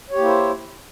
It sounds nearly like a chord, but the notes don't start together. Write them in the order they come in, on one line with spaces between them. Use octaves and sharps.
C#5 G4 A#3 E4 C5